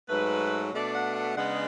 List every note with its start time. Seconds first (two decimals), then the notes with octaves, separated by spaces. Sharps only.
0.09 G#2 F#3 A3 B4
0.73 B2 A3 D4 D5
0.94 F#5
1.16 F#5
1.37 C#3 G#3 B3 D4 F#5